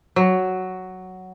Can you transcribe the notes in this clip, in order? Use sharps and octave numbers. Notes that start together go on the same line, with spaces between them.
F#3